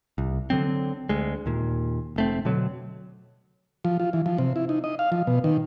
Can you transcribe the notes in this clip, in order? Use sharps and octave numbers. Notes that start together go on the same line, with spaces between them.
C2
D3 F3 F#3 C4
D2 G#3
D#2 A#2
F1 A3 C4
B2 D3 F#3
F3
F4
E3
F3
C3
E4
D#4
D#5
F5
F3
B2
D#3